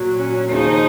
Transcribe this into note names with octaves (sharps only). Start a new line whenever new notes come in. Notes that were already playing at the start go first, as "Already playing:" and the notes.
Already playing: A#2 F#3
C#4
D#2 C#3 F3 D#4